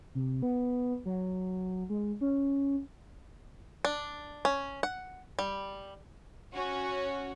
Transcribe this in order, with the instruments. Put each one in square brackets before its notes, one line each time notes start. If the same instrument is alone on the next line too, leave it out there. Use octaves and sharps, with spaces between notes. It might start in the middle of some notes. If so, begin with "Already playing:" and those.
[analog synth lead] C3
B3
F#3
G#3
C#4
[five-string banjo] D4
C#4
F#5
G3
[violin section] C#4 F#4